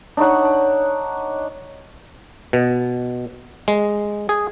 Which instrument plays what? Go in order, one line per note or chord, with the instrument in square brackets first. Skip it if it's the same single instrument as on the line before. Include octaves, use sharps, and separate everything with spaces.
[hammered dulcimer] D4 D#4 C#5 F#5
[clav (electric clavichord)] B2
G#3
G#4